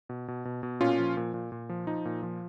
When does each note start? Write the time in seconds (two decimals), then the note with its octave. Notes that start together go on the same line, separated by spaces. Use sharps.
0.09 B2
0.28 B2
0.45 B2
0.63 B2
0.80 A#2 C#4 F4
0.99 F3
1.17 A#2
1.34 A#2
1.52 A#2
1.69 F3
1.87 F3 D#4
2.05 A#2
2.23 F3